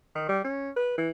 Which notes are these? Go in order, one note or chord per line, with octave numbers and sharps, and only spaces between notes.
D#3
G3
C#4
B4
E3